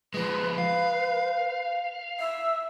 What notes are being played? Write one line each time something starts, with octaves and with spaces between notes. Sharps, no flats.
F3 G#3 B4
F5
E5